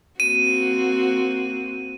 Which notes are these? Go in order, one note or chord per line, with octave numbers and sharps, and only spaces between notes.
A#3 C4 F#4 D#7